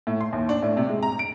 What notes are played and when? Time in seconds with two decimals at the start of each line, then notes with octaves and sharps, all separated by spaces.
0.07 A2
0.21 C6
0.33 D#2
0.49 D4
0.63 A2
0.77 C3
0.89 G#3
1.03 A#5
1.19 D7